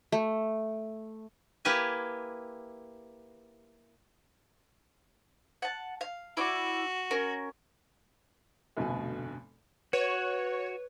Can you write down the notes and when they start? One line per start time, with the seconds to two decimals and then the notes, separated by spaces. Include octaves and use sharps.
0.12 A3
1.65 A#3 E4 G4 B4 G#5
5.62 F#5 A5
6.01 F5
6.37 E4 F#4 D5 D6
7.11 C#4 A#4
8.77 F1 D2 G2 B2 G#5
9.93 F#4 B4 C#5